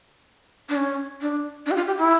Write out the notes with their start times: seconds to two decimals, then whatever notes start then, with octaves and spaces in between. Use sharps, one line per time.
0.69 D4
0.77 C#4
1.22 D4
1.66 D4
1.71 G4
1.76 F4
1.87 G4
1.99 E4